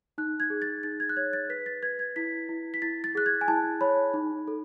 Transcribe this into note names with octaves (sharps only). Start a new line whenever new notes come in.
D#4 F#6
G#6
G#4
A6
D#4 A6
G#6
F#6
C#5 G#6
A6
B4 B6
A6
B4 G#6
G#6
E4 B6
E4
B6
E4 A6
A6
G#4 F#6
G#6
G#5
E4 A5
C#5 B5
D#4
A4